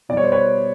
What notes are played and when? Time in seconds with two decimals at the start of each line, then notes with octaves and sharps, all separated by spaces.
0.09 B2 D5
0.14 G3 C#5
0.24 C5
0.32 B4 C#5